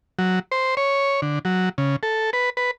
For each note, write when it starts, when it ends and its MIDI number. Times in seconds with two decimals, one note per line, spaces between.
0.19 0.39 54
0.52 0.75 72
0.77 1.21 73
1.22 1.39 50
1.45 1.69 54
1.78 1.96 49
2.03 2.30 69
2.33 2.50 71
2.57 2.71 71